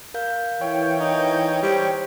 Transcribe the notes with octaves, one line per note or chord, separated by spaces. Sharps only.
A#4 F5 G6
E3 C#5 G5
D#4
G3 G4 C5